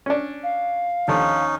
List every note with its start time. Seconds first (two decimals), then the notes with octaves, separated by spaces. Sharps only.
0.06 C#4 D4
0.44 F5
1.08 D#2 D3 F3 C#4 D#4